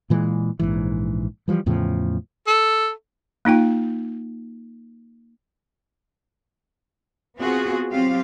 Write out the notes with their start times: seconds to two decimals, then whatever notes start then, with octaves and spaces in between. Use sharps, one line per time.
0.10 A#2 E3 G#3
0.59 A#1 G#2 E3
1.48 E3 F3 G3
1.66 E2 A2 C#3 F3
2.47 A4
3.45 A#3 D#4 F4 G5
7.37 B3 C4 F4 F#4 G#4
7.92 F#3 C4 F4 G4 F5